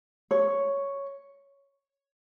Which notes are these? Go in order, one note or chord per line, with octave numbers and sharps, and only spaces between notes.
C#5